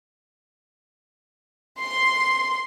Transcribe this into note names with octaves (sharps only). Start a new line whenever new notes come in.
C6